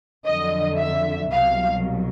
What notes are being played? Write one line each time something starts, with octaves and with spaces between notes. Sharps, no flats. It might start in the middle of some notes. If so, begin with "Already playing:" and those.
F2 D3 F#3 D#5
E5
C2 B2 F#3 F5